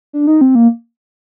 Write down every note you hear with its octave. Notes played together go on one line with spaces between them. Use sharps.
D4
D#4
C4
A#3